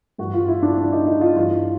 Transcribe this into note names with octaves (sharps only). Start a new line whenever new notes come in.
G2 E3 F#4
F4
E4
D4
D4
D#4
D#4
F4
G2 E3 F4